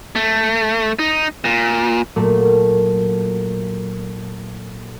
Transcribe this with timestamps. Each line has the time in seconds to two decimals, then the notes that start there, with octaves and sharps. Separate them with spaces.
0.16 A3
0.99 D#4
1.45 A#2
2.16 A#2 F#3 A3